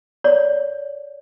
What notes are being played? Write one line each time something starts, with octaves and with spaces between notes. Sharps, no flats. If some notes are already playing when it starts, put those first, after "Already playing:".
C#5 D5